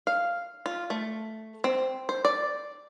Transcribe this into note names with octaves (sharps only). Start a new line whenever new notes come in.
F5
F4
A3
C4
C5
D5